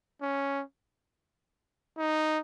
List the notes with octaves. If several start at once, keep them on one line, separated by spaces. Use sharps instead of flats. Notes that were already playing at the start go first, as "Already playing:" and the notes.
C#4
D#4